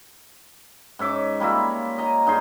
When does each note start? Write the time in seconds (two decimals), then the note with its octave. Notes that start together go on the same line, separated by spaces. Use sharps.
0.99 G#2 C#4 E5 D6
1.40 G3 A#3 F4 E5
1.98 D#5 A#5
2.27 G2 D#4 G#4 C6